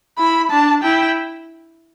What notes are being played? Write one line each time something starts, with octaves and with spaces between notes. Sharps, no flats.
E4 B5
D4 A5
E4 G5